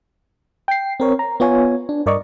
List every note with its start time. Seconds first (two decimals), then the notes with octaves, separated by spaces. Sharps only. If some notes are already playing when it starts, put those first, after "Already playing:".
0.68 G5 C7
1.00 C4 A#4 C#5
1.19 A#5
1.40 B3 F4 C#5 G#5
1.89 D4
2.06 G2 A#4 D5 D#5 C#6